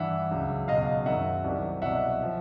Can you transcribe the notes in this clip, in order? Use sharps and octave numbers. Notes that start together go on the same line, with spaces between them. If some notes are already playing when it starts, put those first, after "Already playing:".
Already playing: G2 E3 E5 F#5
C#2 C#3 F#3
C#2 B2 F#3 D#5 F5
F#2 D#3 F#3 E5 F#5
C2 C3 D#3 F#3
C2 B2 F#3 E5 F#5
F3